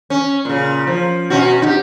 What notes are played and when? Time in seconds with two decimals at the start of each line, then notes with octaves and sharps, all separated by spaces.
0.10 C#4
0.45 A#2 C#3
0.87 F3
1.30 B2 C#4 F#4
1.62 D#4 G4